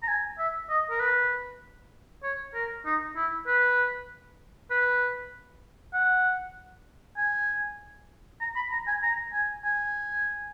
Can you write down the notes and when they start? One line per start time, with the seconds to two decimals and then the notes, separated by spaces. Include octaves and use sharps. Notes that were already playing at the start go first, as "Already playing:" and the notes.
0.03 A#5
0.08 G#5
0.39 E5
0.69 D#5
0.90 A#4
1.00 B4
2.23 C#5
2.54 A#4
2.86 D#4
3.16 E4
3.47 B4
4.71 B4
5.94 F#5
7.17 G#5
8.41 A#5
8.56 B5
8.71 A#5
8.87 G#5
9.03 A#5
9.33 G#5
9.65 G#5